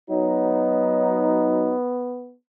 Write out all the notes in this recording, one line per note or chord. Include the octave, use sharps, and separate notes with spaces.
F#3 B3 D#4